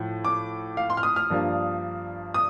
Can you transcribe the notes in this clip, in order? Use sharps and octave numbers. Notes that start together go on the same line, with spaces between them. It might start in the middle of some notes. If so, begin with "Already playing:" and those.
Already playing: A2 F3
D6
F5
C6
F6
D#6
F6
G2 F3 A#3 D4
D#6